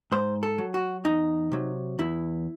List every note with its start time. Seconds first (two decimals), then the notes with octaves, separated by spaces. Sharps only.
0.12 G#2 C5
0.43 A4
0.58 F#3
0.74 F#4
1.04 E2 D#4
1.52 C3 F#3
1.99 E2 E4